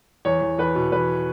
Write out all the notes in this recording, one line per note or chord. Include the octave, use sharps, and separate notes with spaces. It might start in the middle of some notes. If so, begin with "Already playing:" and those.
E2 C#5
E2
E2 B4
B2
E2 B4